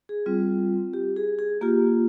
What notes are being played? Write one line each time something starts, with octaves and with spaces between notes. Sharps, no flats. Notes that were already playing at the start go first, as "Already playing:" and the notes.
G#4
G3 C4 F4
G4
G#4
G#4
A#3 F4 G4